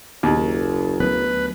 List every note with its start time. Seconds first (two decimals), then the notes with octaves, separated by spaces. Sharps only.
0.23 F#1 D#2
1.00 D2 F#3 B3 B4